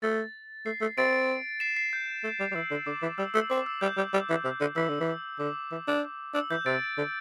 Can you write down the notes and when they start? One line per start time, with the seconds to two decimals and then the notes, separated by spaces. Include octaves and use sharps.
0.03 A3 A6
0.66 A3 C7
0.81 A3
0.98 C4 A6 D7
1.60 C7 E7
1.77 C7
1.93 G6
2.24 A3
2.40 G3
2.51 G3
2.55 E3 E6
2.71 D3
2.86 D3 D6
3.02 E3
3.18 G3 E6
3.34 A3 E6
3.50 C4 D6
3.66 E6
3.81 G3 G6
3.97 G3
4.14 G3
4.30 E3
4.45 C3
4.61 D3
4.76 E3 E6
4.89 D3
5.00 E3
5.39 D3 D6
5.72 E3
5.88 D4
6.34 D4 E6
6.50 E3 G6
6.66 C3 A6 D7
6.98 D3